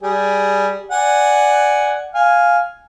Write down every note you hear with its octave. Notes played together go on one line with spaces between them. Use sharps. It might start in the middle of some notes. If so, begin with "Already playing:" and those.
G3 G#4
D5 F#5 G#5
F5 G#5